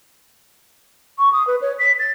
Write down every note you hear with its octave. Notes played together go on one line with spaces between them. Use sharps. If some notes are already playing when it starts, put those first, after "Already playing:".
C#6
D#6
B4
C#5
B6
A6